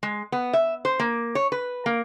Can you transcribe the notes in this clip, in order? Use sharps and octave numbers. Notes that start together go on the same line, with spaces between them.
G#3
B3
E5
C5
A#3
C#5
B4
A#3